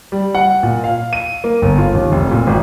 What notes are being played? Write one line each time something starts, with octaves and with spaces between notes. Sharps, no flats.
G3
F#5
A#2
F5
D#7
A#3
G1
F4
D#2
F1
A#2
G#1